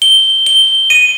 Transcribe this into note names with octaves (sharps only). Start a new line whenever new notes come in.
G7
G7
D#7